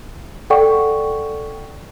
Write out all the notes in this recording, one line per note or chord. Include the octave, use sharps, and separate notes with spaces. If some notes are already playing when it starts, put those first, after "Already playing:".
A4 D5 F#5 G5 C#6